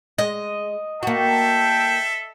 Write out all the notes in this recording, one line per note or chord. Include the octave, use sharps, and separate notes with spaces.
G#3 D#5
A#3 F#4 A4 E5 G5 A5